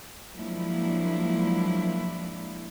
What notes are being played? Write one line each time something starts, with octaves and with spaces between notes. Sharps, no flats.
F3 F#3 G#3 A#3 D4 E4